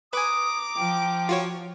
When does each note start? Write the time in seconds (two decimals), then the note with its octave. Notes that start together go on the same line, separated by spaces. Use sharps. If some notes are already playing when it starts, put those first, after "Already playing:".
0.13 B4 G#5 A#5 D6 D#6
0.77 F3 G5
1.29 F4 F#4 C#5